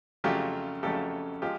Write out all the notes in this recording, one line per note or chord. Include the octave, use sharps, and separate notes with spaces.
F2 C#3 F#3 A3 F4 G4
F2 C#3 F#3 A3 G4 A4
F3 G#3 F4 G4